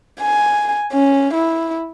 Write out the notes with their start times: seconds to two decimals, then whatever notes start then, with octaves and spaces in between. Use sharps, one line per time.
0.21 G#5
0.93 C#4
1.34 E4